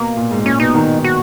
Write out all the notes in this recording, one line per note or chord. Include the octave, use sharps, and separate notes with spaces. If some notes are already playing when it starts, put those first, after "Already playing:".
Already playing: B2 A#3
A#2
G#2
A#2 C#4
B2 D#4
D#3
F#4